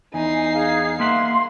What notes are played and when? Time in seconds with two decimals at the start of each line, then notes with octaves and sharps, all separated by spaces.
0.14 E2 D#4 G#5 C7
0.54 G#4 F5
1.00 A#3 E5 F#5 C6